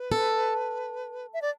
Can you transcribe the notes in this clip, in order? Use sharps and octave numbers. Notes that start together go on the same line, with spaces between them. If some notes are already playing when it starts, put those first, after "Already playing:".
Already playing: B4
A4
E5
D5